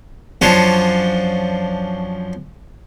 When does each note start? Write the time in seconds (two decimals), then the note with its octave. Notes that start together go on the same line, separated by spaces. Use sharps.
0.42 F#2 F3 C#4 D4 C5 C#5